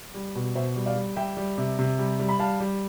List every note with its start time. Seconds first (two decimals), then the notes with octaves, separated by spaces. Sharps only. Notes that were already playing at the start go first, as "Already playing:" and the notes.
0.14 G3
0.35 B2
0.55 B2 C5 E5
0.76 G3
0.86 D5 F5
0.96 G3
1.16 G3 E5 G5
1.37 G3
1.58 C3
1.79 C3
1.99 G3
2.19 G3
2.29 B5
2.39 G3 F5 A5
2.60 G3